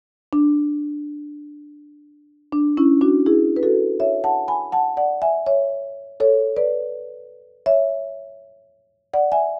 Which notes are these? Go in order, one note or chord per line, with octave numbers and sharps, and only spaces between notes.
D4
D4
C#4 E4
D4 F#4
E4 G#4
B4
F#4 A4
C#5 E5
F#5 A5
G#5 B5
F#5 A5
D5 F#5
E5 G#5
C#5 E5
A4 C#5
B4 D5
C#5 E5
D5 F#5
E5 G#5